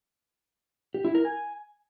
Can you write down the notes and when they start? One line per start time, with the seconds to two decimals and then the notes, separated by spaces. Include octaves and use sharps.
0.94 G4
1.05 E4
1.15 A#4
1.25 G#5